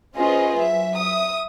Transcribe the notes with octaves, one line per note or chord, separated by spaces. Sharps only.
C#4 F4 G#4 B4 C5 D#5
F#3 E5
E5 D#6